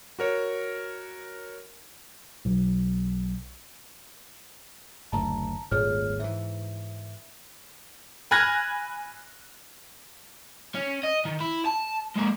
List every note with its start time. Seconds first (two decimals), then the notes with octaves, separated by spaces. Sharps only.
0.19 F#4 A#4 C#5
2.45 B1
5.12 F#1 D2 A5 A#5
5.71 D#1 G#1 A#2 G#4 C#5 F6
6.19 G#2 E3 E5
8.31 G#5 B5 F6 F#6 G#6 A#6
10.75 C#4
11.03 D#5
11.25 D#3
11.40 E4
11.65 A5
12.16 G#3 A#3